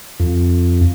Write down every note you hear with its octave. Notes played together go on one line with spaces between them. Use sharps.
F2